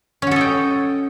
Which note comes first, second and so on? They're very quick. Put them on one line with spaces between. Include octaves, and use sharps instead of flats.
C#4 F#4 A4 D#5 G5